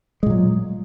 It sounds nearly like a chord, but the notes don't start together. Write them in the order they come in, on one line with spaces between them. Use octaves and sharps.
G#3 A#2 F#3